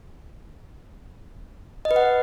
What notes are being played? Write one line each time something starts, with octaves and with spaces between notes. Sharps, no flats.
D#5
B4
F#5